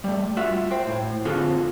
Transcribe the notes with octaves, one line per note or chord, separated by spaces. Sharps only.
G3 A3
F4 F#4 E5 F#5
C5 G5
A2
D3 C4 F4 F#4 G#4 A4